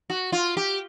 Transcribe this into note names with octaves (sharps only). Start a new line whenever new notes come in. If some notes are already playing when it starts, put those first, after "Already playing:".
F#4
F4
G4